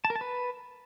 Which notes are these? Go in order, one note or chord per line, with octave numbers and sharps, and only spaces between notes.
A5
A#4
A5
B4